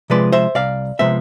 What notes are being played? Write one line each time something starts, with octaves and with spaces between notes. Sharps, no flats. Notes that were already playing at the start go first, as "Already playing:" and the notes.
C3 F3 G#3 B4 D5
C5 E5
C2 D5 F5
C3 F3 G#3 B3 C5 E5